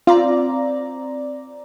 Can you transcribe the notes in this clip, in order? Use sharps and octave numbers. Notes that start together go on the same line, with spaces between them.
C4 F4 D5 A#5